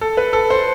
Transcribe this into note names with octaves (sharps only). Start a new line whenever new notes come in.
A4
B4
A4
C5